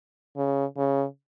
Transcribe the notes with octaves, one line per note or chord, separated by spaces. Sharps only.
C#3
C#3